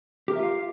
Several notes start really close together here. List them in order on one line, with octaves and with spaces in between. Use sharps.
G4 A#4 E5 F4 F5